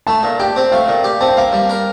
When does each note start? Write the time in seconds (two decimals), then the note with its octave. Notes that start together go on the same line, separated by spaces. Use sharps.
0.07 A3 A5
0.23 A#2
0.40 G4 G5
0.56 C4
0.72 A3 F5
0.88 A#2
1.04 G4
1.21 C4 A5
1.28 G5
1.37 A#3 F5
1.53 G3
1.70 A#4